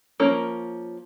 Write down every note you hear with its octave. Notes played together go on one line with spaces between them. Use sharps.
F3 A#3 C#4 A#4